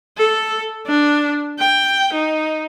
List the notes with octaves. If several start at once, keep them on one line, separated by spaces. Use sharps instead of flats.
A4
D4
G5
D#4